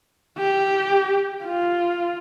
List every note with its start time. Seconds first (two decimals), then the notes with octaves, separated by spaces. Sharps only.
0.38 G4
1.45 F4